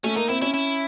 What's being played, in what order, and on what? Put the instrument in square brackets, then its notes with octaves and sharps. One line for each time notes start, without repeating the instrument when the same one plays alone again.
[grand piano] A3 [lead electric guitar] C#4
[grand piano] A#3 [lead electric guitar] D#4
[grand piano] C4 [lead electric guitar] E4
[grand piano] C#4 [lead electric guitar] E4
[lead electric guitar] E4